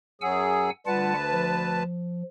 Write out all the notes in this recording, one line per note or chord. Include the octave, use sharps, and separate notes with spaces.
F#2 F#3 G#4 F#5 G#5 E6
D2 G3 F4 B4 F#5 A5
F3